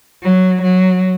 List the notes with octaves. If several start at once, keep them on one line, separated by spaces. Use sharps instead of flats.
F#3
F#3